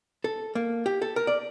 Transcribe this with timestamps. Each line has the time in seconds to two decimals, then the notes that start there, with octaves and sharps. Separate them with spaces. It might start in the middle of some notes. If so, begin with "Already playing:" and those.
0.24 A4
0.55 A#3
0.86 G4
1.02 A4
1.16 A#4
1.27 D5